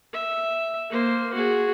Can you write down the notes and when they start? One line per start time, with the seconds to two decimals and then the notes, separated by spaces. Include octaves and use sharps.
0.13 E5
0.90 A#3 C5
1.33 F#4 G#4